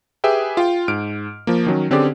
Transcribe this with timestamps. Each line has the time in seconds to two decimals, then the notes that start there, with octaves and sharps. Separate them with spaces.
0.24 G4 G#4 B4 E5 G5
0.57 F4 G5
0.88 G#2 F6 D7
1.47 F3 A#3
1.66 D#3 F#3 C#4
1.91 D3 C4 C#4 G4 G#4 D5